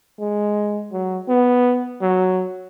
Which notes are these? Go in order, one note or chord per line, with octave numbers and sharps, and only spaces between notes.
G#3
F#3
B3
F#3